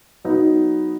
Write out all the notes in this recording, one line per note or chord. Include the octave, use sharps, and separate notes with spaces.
F#3 B3 D#4